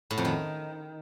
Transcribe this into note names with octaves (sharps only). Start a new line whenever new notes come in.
A2
F2
D#3